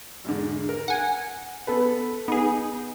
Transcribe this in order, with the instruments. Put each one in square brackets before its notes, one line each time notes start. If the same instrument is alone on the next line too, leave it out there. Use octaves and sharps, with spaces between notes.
[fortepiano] E2 G#2 D3
A#4
[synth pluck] F#5 G#5
[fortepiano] B3 A4 B4
[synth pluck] B3 G#4 [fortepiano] D#4